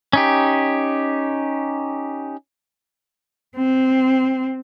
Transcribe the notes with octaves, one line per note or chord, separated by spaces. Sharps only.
C#4 D#4 G4
C4